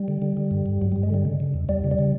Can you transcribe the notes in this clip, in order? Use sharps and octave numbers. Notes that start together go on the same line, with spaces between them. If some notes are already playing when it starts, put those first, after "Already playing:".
Already playing: G3
D3
D3
D3
G2
G2
G2 F#3
G2 G3
G#3
D3 G3
C#3
C#3
E2
E2 G3
C#3
G3
C#3